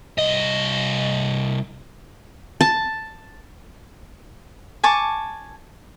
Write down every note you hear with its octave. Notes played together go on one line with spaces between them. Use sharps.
C2 D#5
A5
G#5 A5 C#6 D6